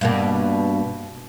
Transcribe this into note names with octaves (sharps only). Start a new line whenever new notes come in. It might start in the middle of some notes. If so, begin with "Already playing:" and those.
G2 B2 A#3